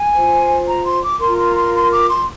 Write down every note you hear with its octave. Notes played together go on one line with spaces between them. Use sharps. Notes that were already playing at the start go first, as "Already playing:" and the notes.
Already playing: G#5
F4 C5
A#5
C6
D6
F4 A#4 C6
C6
C6
C6
D6
C6